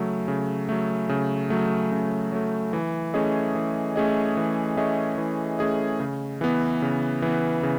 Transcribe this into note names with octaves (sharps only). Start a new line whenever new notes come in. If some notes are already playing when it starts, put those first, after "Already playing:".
Already playing: C#3 F#3 A3
C#3
F#3 A3
C#3
F#3 A3
C#3
F#3 A3
E3
A3 C#4 G#4 D#5
E3
A3 C#4 G#4 D#5
E3
A3 C#4 G#4 D#5
E3
A3 C#4 G#4 D#5
C#3
E3 B3
C#3
E3 B3
C#3